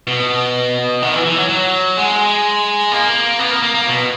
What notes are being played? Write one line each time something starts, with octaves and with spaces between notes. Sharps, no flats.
B2
D#3
E3
E3
F#3
F#3
G#3
A#3
B3
A#3
A#3
A#3
B2